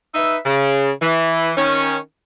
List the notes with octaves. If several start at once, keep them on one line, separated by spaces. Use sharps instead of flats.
D#4 B4 E5
C#3
E3
D#3 C#4